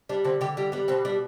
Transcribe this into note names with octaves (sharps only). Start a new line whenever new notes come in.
G3 D4
D3 C4
D3 G4
G3 G4
G3 B3
B2 C4
G3 D4